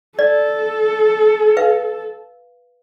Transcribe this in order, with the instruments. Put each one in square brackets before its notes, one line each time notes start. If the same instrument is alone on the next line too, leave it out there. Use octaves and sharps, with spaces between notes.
[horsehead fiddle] A4 [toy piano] D5
[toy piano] B4 F5